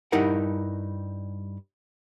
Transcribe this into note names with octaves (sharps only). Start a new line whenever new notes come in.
G2 G3 D#4 E4 A#4 F#5